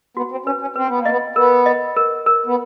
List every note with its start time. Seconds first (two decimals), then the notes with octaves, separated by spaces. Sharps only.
0.17 B3 F#4
0.31 C4
0.46 C#4 B4
0.61 C#4
0.76 C4 B4
0.88 B3
0.98 A#3
1.06 B3 D#5
1.36 B3 A#4
1.66 D#5
1.96 A#4
2.26 A#4
2.46 B3